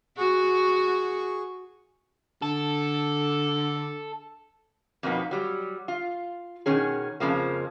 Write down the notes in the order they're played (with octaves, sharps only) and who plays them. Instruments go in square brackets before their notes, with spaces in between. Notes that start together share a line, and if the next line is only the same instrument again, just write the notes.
[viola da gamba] F#4 [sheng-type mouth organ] G#4 C#6
[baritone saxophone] D3 [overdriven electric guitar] A4
[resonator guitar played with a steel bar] F2 B2 A#3 B3 D#4
F#3 G3
F4
B2 D#3 C#4 G#4
F2 C#3 F3 A#3